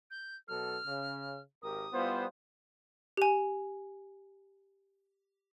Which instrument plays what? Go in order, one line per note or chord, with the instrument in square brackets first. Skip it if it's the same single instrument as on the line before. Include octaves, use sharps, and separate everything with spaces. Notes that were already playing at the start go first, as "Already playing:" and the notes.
[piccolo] G6
[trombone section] B2 F#3 A4 [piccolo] F6
[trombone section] C#3
[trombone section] G#1 G4 A#4 [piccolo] D#6
[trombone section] G3 E4 F4 [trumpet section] B3 C5
[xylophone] G4 G#5